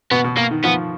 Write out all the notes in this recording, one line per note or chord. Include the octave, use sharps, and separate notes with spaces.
B2 B3
B2
A#3
D#3
F3 B3